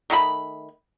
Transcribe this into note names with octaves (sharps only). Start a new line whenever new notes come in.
D#3 A3 G#4 B5